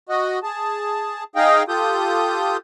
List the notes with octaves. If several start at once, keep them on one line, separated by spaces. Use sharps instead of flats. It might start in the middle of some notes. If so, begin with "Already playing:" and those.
F#4 D#5
G#4 A5
D#4 G#4 D#5 F5 G5
F4 G4 A4 D#6 G6